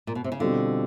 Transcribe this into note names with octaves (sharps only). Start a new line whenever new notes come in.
A#2
B2
C3
C#3
B2 D3 G3 C4 F4